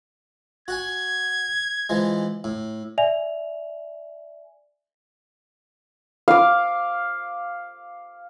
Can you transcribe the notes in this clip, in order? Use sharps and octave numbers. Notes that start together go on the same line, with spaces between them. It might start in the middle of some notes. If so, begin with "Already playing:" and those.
F#4 F#5 G#5 G#6
E3 F3 G#3
A2
D5 E5 G#5 F7
F5 D6